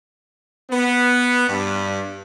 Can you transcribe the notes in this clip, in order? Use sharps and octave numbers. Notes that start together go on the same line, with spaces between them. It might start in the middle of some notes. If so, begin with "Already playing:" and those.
B3
G2